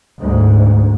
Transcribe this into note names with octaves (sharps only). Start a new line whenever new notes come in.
D2 G#2